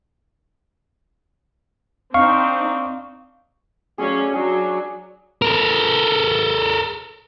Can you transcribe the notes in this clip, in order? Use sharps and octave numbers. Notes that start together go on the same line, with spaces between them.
C4 D4 D#4 F5 C#6
F#3 A3 C#4 G#4 D5 F5
F#3 D4 F#4 G#4
A4 A#4